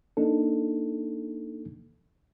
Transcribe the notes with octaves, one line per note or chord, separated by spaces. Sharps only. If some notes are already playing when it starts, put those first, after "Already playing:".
A#3 D4 D#4 A4